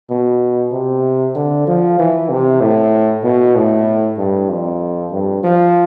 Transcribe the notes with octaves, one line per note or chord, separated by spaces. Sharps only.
B2
C3
D3
F3
E3
C3
A2
B2
A2
G2
F2
G2
F3